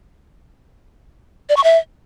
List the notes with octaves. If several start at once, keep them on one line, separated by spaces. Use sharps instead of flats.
D5
C#6
E5